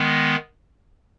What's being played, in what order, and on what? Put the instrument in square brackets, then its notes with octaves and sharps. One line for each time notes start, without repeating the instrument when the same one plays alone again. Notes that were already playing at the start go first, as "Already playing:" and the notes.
Already playing: [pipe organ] D#3 G#3 B3